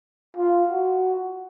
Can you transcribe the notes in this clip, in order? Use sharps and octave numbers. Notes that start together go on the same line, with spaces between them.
F4
F#4